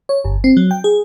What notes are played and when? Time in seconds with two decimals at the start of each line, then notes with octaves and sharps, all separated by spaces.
0.09 C#5
0.24 G1
0.44 C4
0.57 F#3
0.71 G5
0.84 G#4